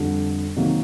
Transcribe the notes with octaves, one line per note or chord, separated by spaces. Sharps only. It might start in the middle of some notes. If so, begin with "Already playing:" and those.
Already playing: F2 D3 G3
C3 D#3 F#3 A#3